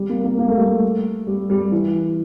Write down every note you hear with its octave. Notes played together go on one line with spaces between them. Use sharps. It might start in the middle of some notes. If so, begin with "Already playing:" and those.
Already playing: G3
A#3
A#3
A#3
A3
G3
A3
G3
G3
G3
E3